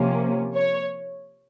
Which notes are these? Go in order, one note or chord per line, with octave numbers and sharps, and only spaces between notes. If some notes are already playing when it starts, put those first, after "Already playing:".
Already playing: C3 F3 A#3 C#4
C#5